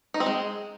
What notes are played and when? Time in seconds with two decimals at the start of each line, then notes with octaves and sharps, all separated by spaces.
0.14 D#4
0.20 C4
0.26 G#3